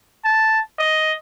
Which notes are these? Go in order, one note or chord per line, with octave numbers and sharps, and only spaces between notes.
A5
D#5